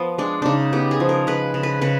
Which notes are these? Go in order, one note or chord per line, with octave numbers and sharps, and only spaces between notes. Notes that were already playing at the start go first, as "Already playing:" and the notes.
Already playing: F3 B3
G#3 D4
C#3 D4 D#4
B3 G4
G#4
F3
A#4
G#3 B4
C#3
B4
C#3 B4